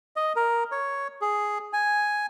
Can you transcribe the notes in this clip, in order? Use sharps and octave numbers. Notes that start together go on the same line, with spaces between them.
D#5
A#4
C#5
G#4
G#5